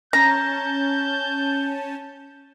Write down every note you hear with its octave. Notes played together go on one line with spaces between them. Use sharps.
C#4 A5 A#5 G6